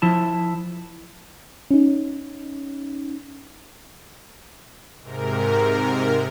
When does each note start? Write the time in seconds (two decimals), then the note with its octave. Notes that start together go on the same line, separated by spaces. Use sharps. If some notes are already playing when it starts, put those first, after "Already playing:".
0.02 F3 E4 A5
1.71 C#4 D#4
5.02 G#2 C3 A#4